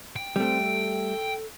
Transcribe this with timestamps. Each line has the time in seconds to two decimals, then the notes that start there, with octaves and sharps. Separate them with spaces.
0.16 G5
0.36 G3 A3 C4
0.63 A4